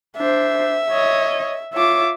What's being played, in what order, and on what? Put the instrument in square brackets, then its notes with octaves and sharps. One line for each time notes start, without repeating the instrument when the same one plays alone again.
[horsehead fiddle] D4 C5 [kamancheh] E5
[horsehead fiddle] C#5 D#5
[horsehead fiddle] F4 E5 [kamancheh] C#5 D6